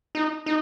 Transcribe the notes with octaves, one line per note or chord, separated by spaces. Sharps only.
D#4
D#4